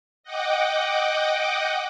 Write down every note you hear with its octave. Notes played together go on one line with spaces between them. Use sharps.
D#5 F#5 G5 D6